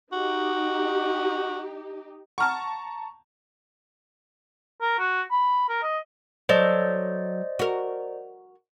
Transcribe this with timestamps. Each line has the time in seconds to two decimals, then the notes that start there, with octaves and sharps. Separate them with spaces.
0.12 D#4 F#4 G4
2.38 F#5 A5 A#5 C#6 F6
4.81 A#4
4.99 F#4
5.31 B5
5.69 A#4
5.82 D#5
6.49 F#3 A4 C5 D5 D#5
7.59 F#4 A#4